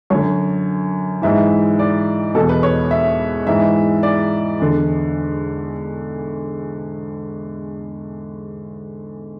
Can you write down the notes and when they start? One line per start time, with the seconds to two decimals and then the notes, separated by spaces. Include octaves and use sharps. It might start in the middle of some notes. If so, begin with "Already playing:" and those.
0.10 F#2 D3 C#5
1.22 G#2 E3 E5
1.79 D5
2.35 B2 A4
2.38 E2
2.49 B4
2.63 C#5
2.91 E5
3.47 G#2 E3 E5
4.03 D5
4.60 E2 D3